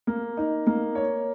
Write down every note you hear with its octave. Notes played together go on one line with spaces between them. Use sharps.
A#3
D#4
A#3
C#5